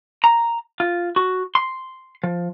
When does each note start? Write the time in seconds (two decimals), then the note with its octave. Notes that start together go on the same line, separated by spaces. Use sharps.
0.24 A#5
0.80 F4
1.16 F#4
1.55 C6
2.23 F3